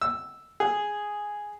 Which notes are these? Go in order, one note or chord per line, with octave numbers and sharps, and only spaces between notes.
E6
G#4